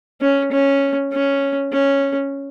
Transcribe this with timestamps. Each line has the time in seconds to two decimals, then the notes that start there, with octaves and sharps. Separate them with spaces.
0.21 C#4
0.51 C#4
1.12 C#4
1.72 C#4